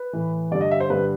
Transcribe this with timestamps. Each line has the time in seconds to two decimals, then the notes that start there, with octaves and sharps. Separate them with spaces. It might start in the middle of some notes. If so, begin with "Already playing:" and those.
Already playing: B4
0.13 A2 E3
0.51 G2 D5
0.55 D3
0.61 D#5
0.71 E5
0.80 C5
0.90 G2 D3 B4